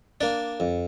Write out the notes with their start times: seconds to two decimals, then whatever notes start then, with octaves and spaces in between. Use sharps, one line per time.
0.21 A#3 D4 D5
0.60 F2